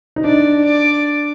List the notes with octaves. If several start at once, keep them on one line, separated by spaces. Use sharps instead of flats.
D#4
D4 D5
D5